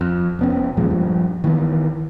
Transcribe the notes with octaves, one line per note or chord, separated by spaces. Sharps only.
F2
F1 B3 C#4
D#2 A#2 F3 G#3
G2 F3
D#3 E3 A3 B3